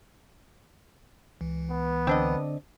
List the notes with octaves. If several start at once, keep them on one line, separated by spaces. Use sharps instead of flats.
C#2 E3
B3
D3 C4 D4 D#5